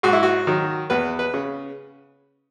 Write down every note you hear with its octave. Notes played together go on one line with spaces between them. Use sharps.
G#2 F#4
E4
F#4
D#3 F#3
E2 B4
B4
C#3